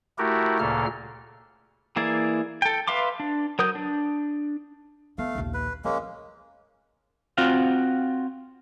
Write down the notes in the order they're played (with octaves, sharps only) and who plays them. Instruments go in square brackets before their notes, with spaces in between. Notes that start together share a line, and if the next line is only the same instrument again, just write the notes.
[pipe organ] A3 E4 F#4 G4 A#4
D2 A#2 C#3 A#3 A4 F6
[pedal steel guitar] E3 A#3 E4 G#4 D5
A4 G5
B4 E5 F5 C6 D6
D4
F#3 A#4 D#6 G6
D4
[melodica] A3 F5 [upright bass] B3
[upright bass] A#1 D#2
[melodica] B4
[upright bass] F2 [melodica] G#3 A#3 C#4
[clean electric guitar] C4 F4 F#4 F5